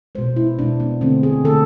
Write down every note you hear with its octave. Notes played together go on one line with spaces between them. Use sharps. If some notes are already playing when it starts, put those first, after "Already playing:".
B2 G#3 C5
E4
B2 G#3 D4
B3
D3 A3 C4
G#4
D3 A3 A4